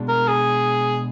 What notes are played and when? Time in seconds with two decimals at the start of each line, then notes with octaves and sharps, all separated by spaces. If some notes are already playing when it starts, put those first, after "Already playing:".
Already playing: B2 G#3 D4
0.08 A#4
0.28 G#4